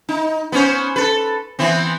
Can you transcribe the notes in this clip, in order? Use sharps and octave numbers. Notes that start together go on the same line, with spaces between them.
D#4
B3 C#4 C5
A4 B4
E3 B3 C4